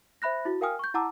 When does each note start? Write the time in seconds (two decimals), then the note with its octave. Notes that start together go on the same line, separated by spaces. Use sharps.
0.22 C5 E5 B5 F#6 A#6
0.45 E4 F#4
0.61 A#4 F5 G5 G#5 D#6 F6
0.79 C#6 G6
0.94 E4 F#5 A5 A#5 D6 E6